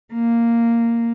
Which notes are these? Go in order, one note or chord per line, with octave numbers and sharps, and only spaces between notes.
A#3